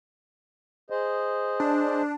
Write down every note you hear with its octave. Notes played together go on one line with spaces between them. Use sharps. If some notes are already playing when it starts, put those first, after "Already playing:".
G#4 C5 D#5
D4